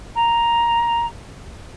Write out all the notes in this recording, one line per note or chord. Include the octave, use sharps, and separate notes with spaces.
A#5